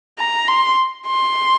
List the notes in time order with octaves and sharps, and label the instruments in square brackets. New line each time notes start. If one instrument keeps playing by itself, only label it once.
[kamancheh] A#5
C6
C6